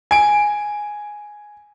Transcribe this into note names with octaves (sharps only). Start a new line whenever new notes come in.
G#5 D7